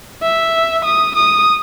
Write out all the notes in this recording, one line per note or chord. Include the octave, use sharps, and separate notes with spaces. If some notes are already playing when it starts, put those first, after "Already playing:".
E5
D#6
D#6